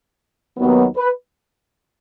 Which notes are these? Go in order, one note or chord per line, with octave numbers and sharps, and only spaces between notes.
D#2 D#3 F#3 B3
B4